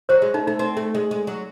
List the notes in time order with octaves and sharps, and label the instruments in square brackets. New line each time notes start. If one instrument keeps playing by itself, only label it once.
[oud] F#3 [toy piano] C5
[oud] G#3
[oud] A3 [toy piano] D#4
[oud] A3 [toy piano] D#4
[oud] C4 [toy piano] D#4
[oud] A3
G#3
G#3
F#3